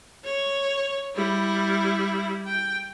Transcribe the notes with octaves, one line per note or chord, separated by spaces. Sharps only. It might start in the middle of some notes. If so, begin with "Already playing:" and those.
C#5
G3 E4
G5